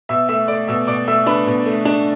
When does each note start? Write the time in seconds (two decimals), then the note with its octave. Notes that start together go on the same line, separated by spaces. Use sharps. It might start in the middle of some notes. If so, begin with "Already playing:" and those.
0.09 B2 E5 E6
0.29 A3 E5 E6
0.48 A3 D5 D6
0.67 B2 E5 E6
0.87 B2 D5 D6
1.08 A3 E5 E6
1.26 D4 B4 B5
1.47 B2
1.66 A3
1.85 D4